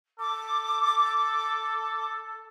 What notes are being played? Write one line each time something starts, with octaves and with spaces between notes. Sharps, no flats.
A4 D6